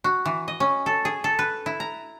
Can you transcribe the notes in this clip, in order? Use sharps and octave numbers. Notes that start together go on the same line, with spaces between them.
F#4
E3
D#5
C#4
A4
G#4
A4
B4
E4
A#5